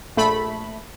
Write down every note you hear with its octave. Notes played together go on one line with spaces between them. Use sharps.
A#1 A3 B5